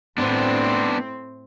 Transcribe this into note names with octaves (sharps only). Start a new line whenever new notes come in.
A2 B3 C4 D4